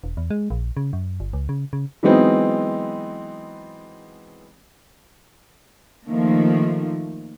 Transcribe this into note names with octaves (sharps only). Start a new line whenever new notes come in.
E1
E2
G#3
A#1
C#3
F#2
G1
C#2
C#3
C#3
E3 F#3 G#3 B3 C4 D#4
D#3 F3 A3 A#3